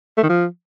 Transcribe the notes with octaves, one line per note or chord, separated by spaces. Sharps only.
A3
D#3
F3